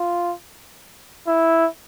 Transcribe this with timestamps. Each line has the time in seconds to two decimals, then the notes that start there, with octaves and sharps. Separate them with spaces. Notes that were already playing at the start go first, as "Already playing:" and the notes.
Already playing: F4
1.27 E4